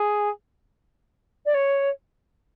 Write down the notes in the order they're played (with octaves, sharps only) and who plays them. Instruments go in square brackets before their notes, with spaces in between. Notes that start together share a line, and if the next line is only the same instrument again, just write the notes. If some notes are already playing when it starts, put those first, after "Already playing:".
Already playing: [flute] G#4
D5
C#5